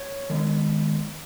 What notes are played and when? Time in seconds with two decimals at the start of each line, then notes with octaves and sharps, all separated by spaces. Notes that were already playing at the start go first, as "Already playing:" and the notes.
Already playing: C#5
0.30 D#3 G#3 B3